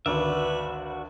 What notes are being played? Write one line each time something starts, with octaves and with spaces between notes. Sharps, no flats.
G#1 D2 F#4 B4 D5 E5